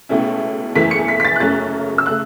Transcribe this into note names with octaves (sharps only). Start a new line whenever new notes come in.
C#2 B2 A3 C#4 E4
F#1 E2 E3 A3 E4 B6
C#7
B6
B6
A6
F#6
F#1 F#2 C#3 A3 C#4 A6
E6
C#3 A3 F#6